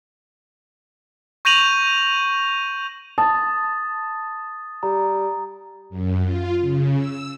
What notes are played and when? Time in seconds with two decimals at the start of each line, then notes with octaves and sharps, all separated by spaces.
1.45 C#6 G6 A#6 D#7 F7 F#7
3.18 A5 D#6 A6
4.83 G3 A#5
5.90 F#2
6.22 F4
6.61 C#3
6.96 E6